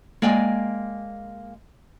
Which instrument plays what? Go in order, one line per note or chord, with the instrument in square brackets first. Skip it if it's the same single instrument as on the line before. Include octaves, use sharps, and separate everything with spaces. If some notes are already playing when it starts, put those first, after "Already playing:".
[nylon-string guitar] G#3 A#3 D5 G5 G#5